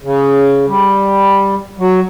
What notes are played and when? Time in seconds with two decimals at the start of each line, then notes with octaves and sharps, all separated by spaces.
0.03 C#3
0.68 G3
1.79 F#3